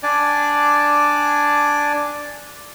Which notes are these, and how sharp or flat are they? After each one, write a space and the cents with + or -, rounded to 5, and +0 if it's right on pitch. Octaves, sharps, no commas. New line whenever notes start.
D4 +0 D5 +0 G#5 +0